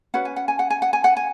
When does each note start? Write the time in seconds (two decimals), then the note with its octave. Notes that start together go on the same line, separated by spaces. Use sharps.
0.14 C#4 F#4 B4 F#5
0.25 G#5
0.36 F#5
0.48 G#5
0.59 F#5
0.70 G#5
0.82 F#5
0.93 G#5
1.04 F#5
1.17 G#5